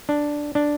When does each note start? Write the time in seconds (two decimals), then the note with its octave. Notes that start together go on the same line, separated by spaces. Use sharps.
0.09 D4
0.55 D4